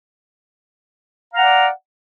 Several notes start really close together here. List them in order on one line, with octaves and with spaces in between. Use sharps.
F5 A#5 F#5 D5